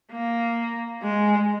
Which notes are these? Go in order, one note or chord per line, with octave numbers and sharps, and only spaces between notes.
A#3
G#3